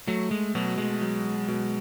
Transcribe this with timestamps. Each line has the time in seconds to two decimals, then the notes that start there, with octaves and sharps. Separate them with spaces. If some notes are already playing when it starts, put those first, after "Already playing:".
0.07 F#3 A3
0.31 G#3
0.55 B2 F#3
0.78 G#3
1.01 F#3
1.48 B2